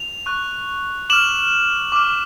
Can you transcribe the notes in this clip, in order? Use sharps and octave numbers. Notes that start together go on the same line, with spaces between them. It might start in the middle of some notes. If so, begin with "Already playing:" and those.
Already playing: F7
C#6 F#6
D6 F6 E7 F#7
D6 F6